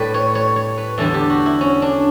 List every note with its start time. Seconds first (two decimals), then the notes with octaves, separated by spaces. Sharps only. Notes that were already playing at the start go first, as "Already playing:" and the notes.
Already playing: A2 G3 B4
0.14 C#5
0.35 C#5
0.56 C#5
0.77 B4
0.98 E2 D3 G3 A4
1.14 G4
1.30 F#4
1.46 E4
1.61 C#4
1.82 D4